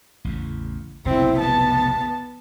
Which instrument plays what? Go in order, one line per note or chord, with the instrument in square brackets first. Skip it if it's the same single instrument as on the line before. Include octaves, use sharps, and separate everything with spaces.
[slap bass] A1 E2 C#3
[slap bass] F1 B1 C#3 [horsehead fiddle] C4 E4
[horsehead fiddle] B3 A5